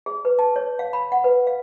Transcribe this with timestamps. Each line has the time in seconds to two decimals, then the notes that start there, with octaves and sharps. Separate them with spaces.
0.06 G#4
0.25 B4
0.39 A5
0.56 C#5
0.79 F5
0.93 B5
1.12 F#5
1.24 B4
1.47 F5